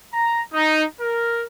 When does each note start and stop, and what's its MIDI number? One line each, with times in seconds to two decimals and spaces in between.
0.13 0.41 82
0.53 0.83 63
1.00 1.43 70